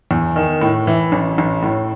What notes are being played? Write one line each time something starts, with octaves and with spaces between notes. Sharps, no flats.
E2
D#3
A2
E3
A1
A1
A2